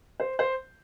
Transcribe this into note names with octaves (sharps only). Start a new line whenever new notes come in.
C5
C5